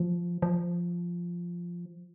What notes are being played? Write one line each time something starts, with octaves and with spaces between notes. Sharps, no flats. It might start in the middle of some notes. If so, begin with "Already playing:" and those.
Already playing: F3
F3